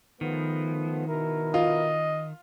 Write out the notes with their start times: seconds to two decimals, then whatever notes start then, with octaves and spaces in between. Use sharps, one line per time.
0.21 D#3 F3 A3 B3
1.08 B2 E4 A#4
1.54 F4 D#5